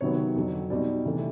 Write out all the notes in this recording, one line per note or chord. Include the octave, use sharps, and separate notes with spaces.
C3 D#3 F#3 B3 C#5
F2 D3 F#3
B2 G3 C4 D#4 D5
C3 E3 A3 D4